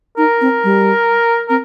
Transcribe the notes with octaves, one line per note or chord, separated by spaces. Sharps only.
D#4 A#4
C4
G3
C4 A#4